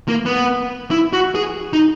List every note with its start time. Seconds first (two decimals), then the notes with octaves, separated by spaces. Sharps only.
0.08 A#3
0.25 B3
0.91 E4
1.13 F#4
1.35 G#4
1.73 D#4